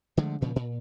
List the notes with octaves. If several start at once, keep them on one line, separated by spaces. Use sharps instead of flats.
D3 F3 G#3 A3
G2 A#2 C#3 F3
A#2